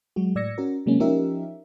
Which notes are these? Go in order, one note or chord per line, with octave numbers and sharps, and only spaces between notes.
F#3 G#3 F#4
A2 D5 E6 G#6 A#6 C#7
C#4 F#4 A#4
C3 F#3 G#3 A#3 C#4
F3 C#4 D#4 G4 A#4 E5